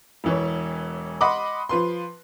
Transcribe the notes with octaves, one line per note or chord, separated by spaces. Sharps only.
E1 E3 C#5
D#5 F#5 B5 C6 D6
F3 B4 C6